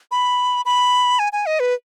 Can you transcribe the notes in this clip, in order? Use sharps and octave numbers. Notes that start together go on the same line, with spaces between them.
B5
B5
G#5
G#5
D#5
B4